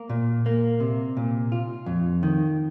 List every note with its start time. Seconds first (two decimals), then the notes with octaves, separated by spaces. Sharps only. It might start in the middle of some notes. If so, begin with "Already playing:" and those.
Already playing: A#3
0.09 A#2
0.46 A#3
0.80 C3
1.17 A#2
1.52 F4
1.86 F2
2.23 D#3